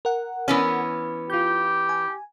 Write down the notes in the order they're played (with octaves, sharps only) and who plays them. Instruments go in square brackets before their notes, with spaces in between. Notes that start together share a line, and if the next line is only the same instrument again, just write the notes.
[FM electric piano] A#4 F#5
[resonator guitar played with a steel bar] E3 B3 C#4
[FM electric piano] F4 G6 [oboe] G4
[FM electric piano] G#5